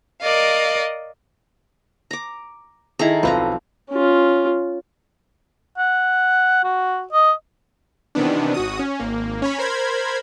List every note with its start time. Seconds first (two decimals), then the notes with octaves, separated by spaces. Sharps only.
0.21 A#4 D5 D#5 F5
2.11 A#5 D6
2.99 D#3 D#4 E4 G#4 A4 A#5
3.23 B1 F3 C4 A4 B4 A#5
3.91 C#4 F4
5.78 F#5
6.64 F#4
7.13 D#5
8.15 C3 D#3 E3 B3 D4
8.54 G#1 F#4 D#6
8.79 C#4
9.00 G#1 A#3
9.42 C#4 C#5 B5
9.58 A#4 C5 B5 G#6